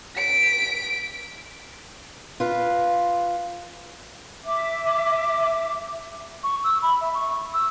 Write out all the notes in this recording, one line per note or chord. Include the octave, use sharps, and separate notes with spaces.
B6 D7
F4 B4
E5 D6
C#6
E6
B5
E5
C#6
E6